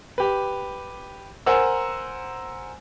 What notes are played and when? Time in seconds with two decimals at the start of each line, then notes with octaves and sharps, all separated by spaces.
0.18 G4 B4
1.46 A#4 C5 F#5 G#5 A#5 E6